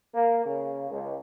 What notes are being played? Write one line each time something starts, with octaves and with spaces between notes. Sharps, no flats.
A#3
C#3
C#2